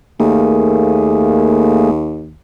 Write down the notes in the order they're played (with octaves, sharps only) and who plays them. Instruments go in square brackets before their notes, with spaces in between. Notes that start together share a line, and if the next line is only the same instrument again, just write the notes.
[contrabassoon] D#2 [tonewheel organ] A3 A#3 G#4